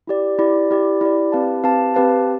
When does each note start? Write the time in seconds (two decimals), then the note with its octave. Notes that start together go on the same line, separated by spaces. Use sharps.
0.07 E4 G4 D5
0.39 E4 G4 D5
0.71 E4 G4 D5
1.01 E4 G4 D5
1.32 C4 G4 B4 F5 A5
1.64 C4 G4 B4 F5 A5
1.94 C4 G4 B4 F5 A5